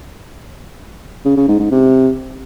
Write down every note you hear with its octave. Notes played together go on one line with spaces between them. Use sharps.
C#3
C#3
G#2
G#2
C3